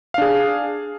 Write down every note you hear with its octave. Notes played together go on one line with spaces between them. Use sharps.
D4 G#4 F5